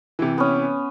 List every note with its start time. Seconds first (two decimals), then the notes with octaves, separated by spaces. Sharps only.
0.19 C3 E3
0.38 B3 C#4